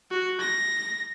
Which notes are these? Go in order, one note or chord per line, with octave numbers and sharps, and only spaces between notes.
F#4
A#6